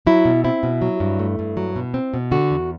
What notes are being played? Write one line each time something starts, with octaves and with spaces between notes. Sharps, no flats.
F#3 E4
B2
C4 E4
B2
F#3
G2
A3
G2
F#3
B2
C4
B2
D3 F#4
E2